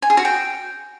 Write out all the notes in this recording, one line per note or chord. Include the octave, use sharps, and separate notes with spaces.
G#5
G#4
F#4
G5